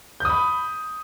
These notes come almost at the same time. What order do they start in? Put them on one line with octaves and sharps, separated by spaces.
G6 D#6 B5